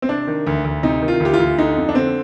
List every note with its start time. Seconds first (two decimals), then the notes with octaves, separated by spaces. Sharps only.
0.02 C4
0.09 C3 D4
0.27 D#3
0.47 D2
0.64 D2
0.83 C3 D#4
1.02 D#3
1.08 F4
1.20 D2 G4
1.33 F4
1.40 D2
1.58 D3 D#4
1.77 F2
1.89 D4
1.95 D3 C4